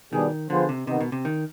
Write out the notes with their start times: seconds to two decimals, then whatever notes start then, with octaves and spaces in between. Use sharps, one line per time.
0.12 B2 D#3 G3 D4 G#4
0.50 D3 F3 B3 F4 G#4 C5
0.69 C3
0.87 C3 D#3 B3 D#4
1.01 B2
1.12 C3
1.25 D#3